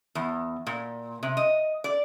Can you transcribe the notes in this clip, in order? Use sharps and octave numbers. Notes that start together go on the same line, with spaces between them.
E2
A#2
C3
D#5
D5